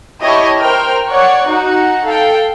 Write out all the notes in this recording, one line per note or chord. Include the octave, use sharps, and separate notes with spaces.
E4 G4 C#5 D#5 A5
A#4 C5 G5 A#5 F6
C#5 D5 F#5 C#6
D#4 F#4 F#5
A4 F5 G5